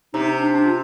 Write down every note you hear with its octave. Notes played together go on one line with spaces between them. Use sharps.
C3 D#4
D#4
D4
D4
F4